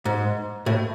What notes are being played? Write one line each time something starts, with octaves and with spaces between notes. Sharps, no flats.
G#2
A2